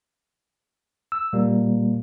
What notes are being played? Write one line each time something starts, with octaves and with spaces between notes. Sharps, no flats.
E6
A#2 G3 A#3